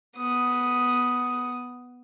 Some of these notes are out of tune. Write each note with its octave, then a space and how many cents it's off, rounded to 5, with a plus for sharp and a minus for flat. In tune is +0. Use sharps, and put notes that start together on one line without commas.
B3 +0 D#6 +0